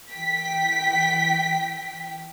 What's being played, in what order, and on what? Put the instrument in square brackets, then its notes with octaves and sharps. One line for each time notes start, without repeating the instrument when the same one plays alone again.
[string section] E3 G5 B6